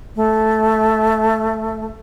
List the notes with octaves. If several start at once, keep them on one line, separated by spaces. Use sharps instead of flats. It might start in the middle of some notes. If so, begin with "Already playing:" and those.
A3